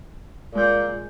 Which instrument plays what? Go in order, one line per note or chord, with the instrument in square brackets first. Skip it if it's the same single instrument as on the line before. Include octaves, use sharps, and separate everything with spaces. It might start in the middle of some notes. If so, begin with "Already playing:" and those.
[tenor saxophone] A#2 [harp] G#3 G6